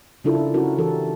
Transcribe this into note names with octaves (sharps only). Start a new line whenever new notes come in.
C#3 D4 E4 F4 A4 A#4
C#4 E4 F#4 A#4
E3 G4 A4 A#4